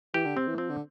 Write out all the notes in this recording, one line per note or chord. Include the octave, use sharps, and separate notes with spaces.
E3 G4
D3
C3 C4
E3
F3 C4
D3